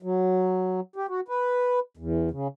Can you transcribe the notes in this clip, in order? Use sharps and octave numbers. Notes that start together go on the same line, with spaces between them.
F#3
G4
F#4
B4
E2
C#3